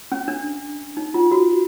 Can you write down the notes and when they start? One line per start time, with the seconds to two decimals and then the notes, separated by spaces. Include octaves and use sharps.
0.12 C#4
0.28 D4
0.97 D#4
1.14 F4
1.31 F#4